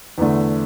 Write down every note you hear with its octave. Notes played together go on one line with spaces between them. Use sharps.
E2 D3 A3